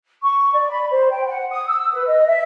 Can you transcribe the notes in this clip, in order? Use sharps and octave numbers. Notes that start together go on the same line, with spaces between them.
C#6
D5
B5
C5
G5
F#5
D#6
E6
B4
D#5
E5